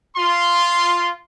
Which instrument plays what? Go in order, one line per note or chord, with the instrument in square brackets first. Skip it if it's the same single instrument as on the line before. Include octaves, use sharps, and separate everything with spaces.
[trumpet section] F4 C6